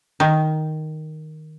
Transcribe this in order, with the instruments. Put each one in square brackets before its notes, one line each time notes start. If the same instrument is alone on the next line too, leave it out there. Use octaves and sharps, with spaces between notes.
[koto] D#3